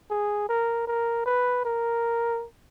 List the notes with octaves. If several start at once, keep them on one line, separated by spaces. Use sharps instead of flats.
G#4
A#4
A#4
B4
A#4